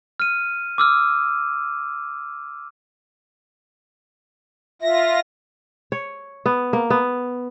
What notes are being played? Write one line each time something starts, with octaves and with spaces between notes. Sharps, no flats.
F6 D#7
D6 E6 F6
F4 E5 A#6
C#5
B3
A#3
B3